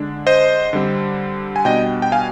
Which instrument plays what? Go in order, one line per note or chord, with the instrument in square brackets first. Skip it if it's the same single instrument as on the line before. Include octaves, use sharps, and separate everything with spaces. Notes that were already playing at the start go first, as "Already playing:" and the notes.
Already playing: [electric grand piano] D3 G#3 D4
C5 D#5
D3 G3 C4
G#5
B2 G3 B3 D4 D#5 G5
G5
F5 G#5